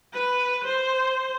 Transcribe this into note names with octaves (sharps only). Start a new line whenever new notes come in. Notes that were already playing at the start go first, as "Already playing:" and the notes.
B4
C5